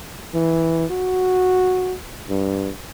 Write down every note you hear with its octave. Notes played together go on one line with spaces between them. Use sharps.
E3
F#4
G2